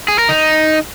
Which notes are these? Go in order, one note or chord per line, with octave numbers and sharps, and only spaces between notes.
G#4
A#4
D#4